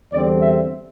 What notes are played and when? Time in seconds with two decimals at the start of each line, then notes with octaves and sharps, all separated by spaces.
0.13 E2 D3 G3 C4 D5
0.42 E5